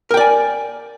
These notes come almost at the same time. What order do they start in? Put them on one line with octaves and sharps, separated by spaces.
A#4 G5 D5 G#5